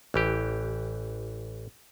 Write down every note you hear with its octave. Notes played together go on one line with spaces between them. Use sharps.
A1 E3 G4